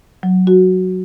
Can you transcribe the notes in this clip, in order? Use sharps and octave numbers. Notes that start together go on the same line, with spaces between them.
F#3
F#4